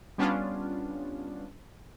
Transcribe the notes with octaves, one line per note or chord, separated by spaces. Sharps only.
G3 B3 C#4 D4 F4